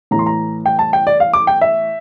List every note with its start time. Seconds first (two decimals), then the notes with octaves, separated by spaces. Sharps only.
0.11 A2 E3 A#5
0.19 C6
0.26 A#5
0.66 G5
0.79 A5
0.93 G5
1.07 D5
1.20 F5
1.33 D6
1.47 G5
1.61 E5